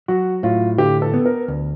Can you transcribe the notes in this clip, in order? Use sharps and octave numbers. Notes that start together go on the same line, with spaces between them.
F#3 F#4
A2 F4
D3 G4
A4
B3
A#4
D2